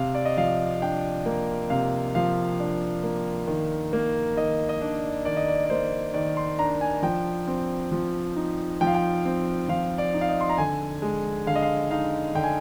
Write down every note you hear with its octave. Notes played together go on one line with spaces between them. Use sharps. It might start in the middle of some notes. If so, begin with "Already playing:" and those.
Already playing: C3 F5
D5
D#5
F3 F5
D4 G5
A#3
C3 F5
F3 F5
D4
A#3
D#3
A#3
D#3 D#5
D#5
D4 D5
D#3 D5
D#5
D5
D5
A#3 C5
D#3 D5
C6
D4 A#5
G#5
F3 G5
C4
F3
D#4
F3 G5
F5
G5
C4
F3 F5
D5
D#4
F5
D#5
C6
A#5
D3 G#5
G#3
D3 F5
D#5
F5
D#4 F5
D3 G5
G#5